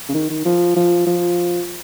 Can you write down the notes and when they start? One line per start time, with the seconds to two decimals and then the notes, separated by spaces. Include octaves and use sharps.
0.09 C#3
0.14 D#3
0.30 D#3
0.45 F3
0.76 F3
1.07 F3